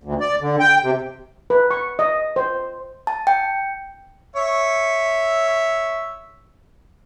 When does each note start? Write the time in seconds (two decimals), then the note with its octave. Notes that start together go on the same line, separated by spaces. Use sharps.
0.04 D2
0.20 D5
0.41 D3
0.59 G5
0.83 C3
1.50 B4
1.71 C#6
1.99 D#5
2.36 C5
3.07 A5
3.27 G5
4.36 C#5 E5